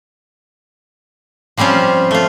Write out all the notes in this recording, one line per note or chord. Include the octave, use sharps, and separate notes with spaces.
F3 G3 C4 C#4 F4
A3 F4